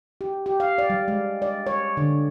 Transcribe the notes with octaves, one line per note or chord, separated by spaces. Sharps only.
G4
G4
F5
D5
G3
G#3
D5
C#5
D3